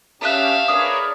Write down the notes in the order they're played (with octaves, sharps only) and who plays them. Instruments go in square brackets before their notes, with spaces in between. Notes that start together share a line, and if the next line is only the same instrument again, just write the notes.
[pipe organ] C#4 G4 [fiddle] E5 F5 [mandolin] A5 D#6 F#6
[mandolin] D4 E4 G#4 [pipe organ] A#4 B4 C#5 [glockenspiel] D#6